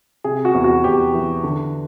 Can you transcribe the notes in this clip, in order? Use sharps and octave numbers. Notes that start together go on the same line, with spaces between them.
C3 G#4
F#4
E2
F#4
E2 G4
E3
D3